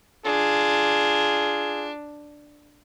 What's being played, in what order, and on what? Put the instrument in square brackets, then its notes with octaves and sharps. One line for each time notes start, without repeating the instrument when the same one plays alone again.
[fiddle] D4 [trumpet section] F4 G#4